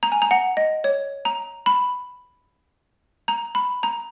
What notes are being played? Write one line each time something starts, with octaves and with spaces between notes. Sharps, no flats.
A#5
G#5
A#5
F#5
D#5
C#5
A#5
B5
A#5
B5
A#5